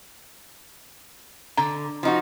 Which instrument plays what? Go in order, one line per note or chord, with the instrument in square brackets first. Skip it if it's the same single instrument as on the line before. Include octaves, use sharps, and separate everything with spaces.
[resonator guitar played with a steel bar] D3 [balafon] A#5
[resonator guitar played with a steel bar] F3 D#4 F#4